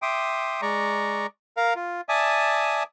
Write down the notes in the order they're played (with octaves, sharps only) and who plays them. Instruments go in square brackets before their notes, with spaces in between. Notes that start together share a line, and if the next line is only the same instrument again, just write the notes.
[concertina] E5 G5 C6 D6 D#6
G#3 D5 A#5 C#6
A#4 F5
F4
D5 E5 G#5 A5 D#6